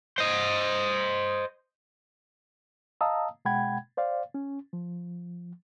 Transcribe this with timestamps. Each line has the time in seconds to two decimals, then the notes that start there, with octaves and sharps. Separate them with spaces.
0.18 C5 D#5
3.01 D#5 F5 A5 A#5 D#6 E6
3.45 B2 G#3 F#5 G5 B5 G#6
3.97 C5 D5 F5
4.34 C#4
4.73 F3